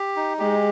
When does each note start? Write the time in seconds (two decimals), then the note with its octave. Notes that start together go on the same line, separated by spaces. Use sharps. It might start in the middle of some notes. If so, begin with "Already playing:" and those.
Already playing: G4
0.16 D#4
0.39 G#3 G4